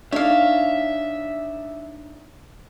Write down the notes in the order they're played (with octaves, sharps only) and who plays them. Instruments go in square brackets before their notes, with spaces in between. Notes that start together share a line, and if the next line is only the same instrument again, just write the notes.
[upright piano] D4 D#4 D5 [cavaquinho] C#5 F5 [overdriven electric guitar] E5